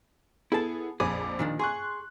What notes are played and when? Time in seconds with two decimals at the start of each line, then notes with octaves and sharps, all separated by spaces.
0.52 B3 E4 G#4 A4 A5
1.00 A#1 F2 G#4 B4 D6
1.39 A#2 D#3 D4
1.59 G#4 C6 C#6 F#6